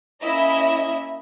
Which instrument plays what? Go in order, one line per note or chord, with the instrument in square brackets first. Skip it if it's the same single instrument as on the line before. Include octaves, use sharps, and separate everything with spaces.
[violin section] A#3 C#4 E4 D#5 E5